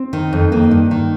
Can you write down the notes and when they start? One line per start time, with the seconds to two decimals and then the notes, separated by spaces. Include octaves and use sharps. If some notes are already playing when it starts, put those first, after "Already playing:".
Already playing: C4
0.13 D#3
0.33 F2
0.52 D#3 A#3
0.71 G2
0.91 D#3